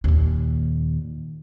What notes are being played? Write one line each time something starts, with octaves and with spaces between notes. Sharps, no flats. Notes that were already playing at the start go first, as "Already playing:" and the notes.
D#2 A#2